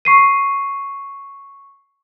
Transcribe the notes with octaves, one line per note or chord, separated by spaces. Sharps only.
C#6 C7 D#7